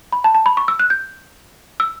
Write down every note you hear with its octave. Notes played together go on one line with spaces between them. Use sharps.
B5
A5
A5
B5
C#6
E6
F#6
G6
E6